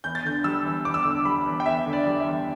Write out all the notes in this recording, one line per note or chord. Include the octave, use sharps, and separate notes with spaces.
E2 G6
A6
D3 G6
G3 E6
E2
E2 D6
E6
D3 D6
G3 B5
E2
G5
E2 E5
D3
D5
G3
E5
E2